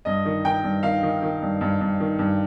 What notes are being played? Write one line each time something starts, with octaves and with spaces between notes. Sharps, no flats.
G2 D#5
D#3
D#3 G5
G2
D#3 F5
D#3
D#3
G2
G2
G2
D#3
G2